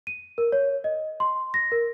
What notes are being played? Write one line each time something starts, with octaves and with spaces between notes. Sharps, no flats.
D#7
A#4
C#5
D#5
C6
A#6
A#4